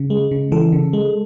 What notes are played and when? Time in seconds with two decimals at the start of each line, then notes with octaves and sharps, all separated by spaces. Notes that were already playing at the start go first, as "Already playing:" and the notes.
Already playing: C#3
0.10 G#3
0.31 C#3
0.52 E3 A4
0.72 C#3
0.93 G#3